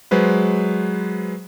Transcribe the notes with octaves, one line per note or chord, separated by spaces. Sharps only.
F#3 G#3 B4 C5